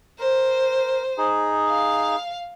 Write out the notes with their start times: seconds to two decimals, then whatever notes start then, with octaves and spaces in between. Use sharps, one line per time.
0.19 A#4 C5
1.18 D#4 G#4
1.69 F5